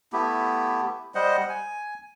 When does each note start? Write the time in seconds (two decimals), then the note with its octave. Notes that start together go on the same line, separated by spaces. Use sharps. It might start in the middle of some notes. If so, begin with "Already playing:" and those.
0.13 A3 B3 E4 G4
1.15 G3 C5 D#5 F#5
1.49 G#5